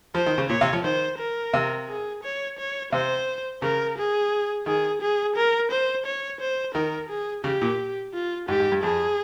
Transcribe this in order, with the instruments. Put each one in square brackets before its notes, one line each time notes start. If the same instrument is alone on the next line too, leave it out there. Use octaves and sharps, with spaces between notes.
[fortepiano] F3 [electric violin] C5
[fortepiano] D#3
C#3
[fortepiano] A#2 [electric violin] C#5
[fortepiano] C3
F3
[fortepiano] D#3 [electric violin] C5
[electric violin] A#4
[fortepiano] C3
[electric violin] G#4
C#5
C#5
[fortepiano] C3 [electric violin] C5
[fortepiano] C#3 [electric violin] A#4
[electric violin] G#4
[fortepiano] D#3 [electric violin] G#4
[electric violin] G#4
A#4
C5
C#5
C5
[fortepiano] D#3 [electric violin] A#4
[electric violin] G#4
[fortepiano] C#3 [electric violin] G4
[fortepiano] A#2
[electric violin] F4
[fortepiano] G#2 [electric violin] G4
[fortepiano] G#2
G2
[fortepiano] F2 [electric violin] G#4